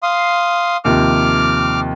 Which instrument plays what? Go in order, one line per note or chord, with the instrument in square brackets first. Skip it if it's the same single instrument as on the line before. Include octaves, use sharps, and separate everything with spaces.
[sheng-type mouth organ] F5 C6 D#6
[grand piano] D#2 C3 F3 [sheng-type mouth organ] D6 F6